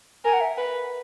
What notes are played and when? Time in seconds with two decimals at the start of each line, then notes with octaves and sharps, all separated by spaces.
0.25 A#4 G#5
0.33 F#5
0.41 E5
0.58 B4